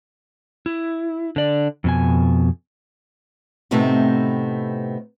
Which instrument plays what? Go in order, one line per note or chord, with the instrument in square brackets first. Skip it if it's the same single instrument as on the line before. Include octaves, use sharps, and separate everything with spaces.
[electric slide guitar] E4
D3 D5
F2 B2 G#5
[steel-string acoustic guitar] A2 C3 A3 B3 C4 D#4